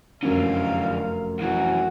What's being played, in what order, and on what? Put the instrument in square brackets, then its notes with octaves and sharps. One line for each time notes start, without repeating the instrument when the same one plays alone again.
[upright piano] F1 F#2 C#4 [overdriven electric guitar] D3 F#3 [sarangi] F5
[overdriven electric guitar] B1 E3 [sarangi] F#4